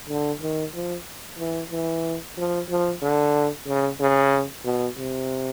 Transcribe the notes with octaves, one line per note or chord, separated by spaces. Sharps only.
D3
D#3
F3
E3
E3
F3
F3
D3
C#3
C#3
B2
C3